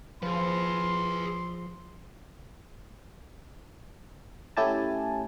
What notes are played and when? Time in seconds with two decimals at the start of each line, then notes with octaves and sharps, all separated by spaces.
0.23 F3 G#4 B4 C6
4.57 A3 C#4 E4 G4 G#5 A5